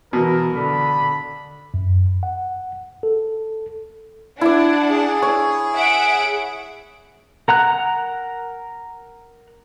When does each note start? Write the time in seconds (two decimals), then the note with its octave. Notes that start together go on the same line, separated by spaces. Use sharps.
0.13 B2 E3 A#4
0.54 D3 B5
1.74 F#2
2.23 F#5
3.03 A4
4.41 D4 E4 D5 F#5
4.91 G#4
5.22 C#5
5.74 E5 F#5 D7
7.48 A#4 F#5 A#5 F#6